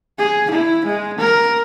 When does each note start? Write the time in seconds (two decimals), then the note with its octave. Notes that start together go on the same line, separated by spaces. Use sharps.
0.18 G#4
0.50 E4
0.85 G#3
1.18 A#4